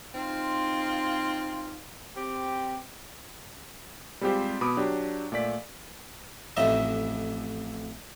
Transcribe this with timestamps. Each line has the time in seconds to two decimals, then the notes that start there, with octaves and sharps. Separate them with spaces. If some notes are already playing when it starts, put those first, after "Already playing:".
0.15 C4 D#4 F4
2.16 C4 G4
4.21 G3 G#3 C4 F4 G4 C5
4.61 B2 B5 D6 D#6
4.77 F#3 D4 G4
5.32 A#2 A3 D5 B6
6.57 A1 F2 A2 D#4 D#5 E5